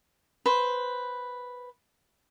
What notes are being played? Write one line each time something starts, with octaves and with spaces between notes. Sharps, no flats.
B4 C5